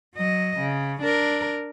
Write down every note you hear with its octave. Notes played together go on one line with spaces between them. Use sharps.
F#3 D#5
C#3
D4 A#4